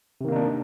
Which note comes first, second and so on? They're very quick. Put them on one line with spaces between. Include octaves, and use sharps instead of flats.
C3 D#3 A#3 D#4 D4